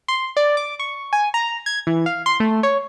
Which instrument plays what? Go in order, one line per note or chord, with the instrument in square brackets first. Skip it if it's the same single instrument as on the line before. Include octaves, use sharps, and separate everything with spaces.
[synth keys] C6
D5
D6
C#6
G#5
A#5
G#6
E3
F5
C6
A3
C#5